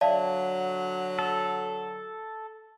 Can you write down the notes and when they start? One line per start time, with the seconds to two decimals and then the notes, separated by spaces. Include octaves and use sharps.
0.01 D3 F#3 D5 E5 F5 A5
1.19 A4